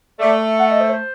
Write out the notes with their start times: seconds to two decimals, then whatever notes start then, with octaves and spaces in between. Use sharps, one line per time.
0.20 A3 D5
0.60 F#5
0.71 D#5
0.80 C5
0.90 C5